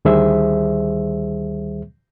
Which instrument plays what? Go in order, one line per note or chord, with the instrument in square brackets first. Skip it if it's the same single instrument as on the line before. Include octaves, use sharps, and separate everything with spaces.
[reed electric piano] D2 D#3 G3 G#4 C5 E5